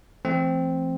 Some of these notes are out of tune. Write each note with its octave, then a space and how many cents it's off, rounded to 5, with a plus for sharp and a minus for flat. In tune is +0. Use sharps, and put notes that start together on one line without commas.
E3 +40 A3 -10 C4 +0